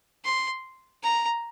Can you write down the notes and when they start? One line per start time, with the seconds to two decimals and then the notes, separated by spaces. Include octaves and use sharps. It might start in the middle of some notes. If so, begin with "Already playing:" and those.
0.24 C6
1.03 A#5